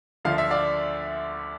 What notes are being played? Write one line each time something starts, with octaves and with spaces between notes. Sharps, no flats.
D2 D3 F3 F5
E5
D5 F5